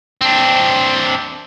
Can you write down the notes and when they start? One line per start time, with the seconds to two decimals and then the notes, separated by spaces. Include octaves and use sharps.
0.21 C4 D4